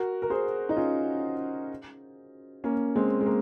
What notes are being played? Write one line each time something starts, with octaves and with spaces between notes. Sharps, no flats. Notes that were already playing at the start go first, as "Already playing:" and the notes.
Already playing: F#4 A#4
A#4
G#4 C5
D#4
C#4 F4
A#3 C#4
G#3 C4
G#3
A#3